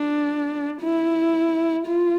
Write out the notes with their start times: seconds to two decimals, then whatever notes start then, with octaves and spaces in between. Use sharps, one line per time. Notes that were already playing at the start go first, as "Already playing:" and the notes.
Already playing: D4
0.81 E4
1.88 F4